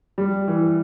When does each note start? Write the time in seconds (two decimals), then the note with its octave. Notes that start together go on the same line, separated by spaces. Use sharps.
0.18 G3
0.48 E3